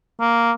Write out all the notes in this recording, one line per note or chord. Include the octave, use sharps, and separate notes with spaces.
A#3